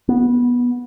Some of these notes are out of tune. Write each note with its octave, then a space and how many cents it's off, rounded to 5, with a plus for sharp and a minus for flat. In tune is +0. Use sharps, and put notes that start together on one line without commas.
B3 -15